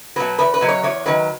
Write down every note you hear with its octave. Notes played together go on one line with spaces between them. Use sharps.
B2 F#3 B4
E2 B4
B4
B2 F#3
C#5
E2 C#5
D#3 F#3 B4